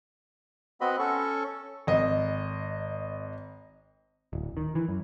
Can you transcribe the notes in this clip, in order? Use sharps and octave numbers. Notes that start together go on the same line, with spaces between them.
B3 C4 F#4 D#5 B5
C#4 A4 C#6
G#1 D#5
D1
D#3
E3
F#2